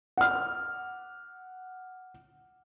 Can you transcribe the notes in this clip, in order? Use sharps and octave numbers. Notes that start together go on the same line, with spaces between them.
F#5 F6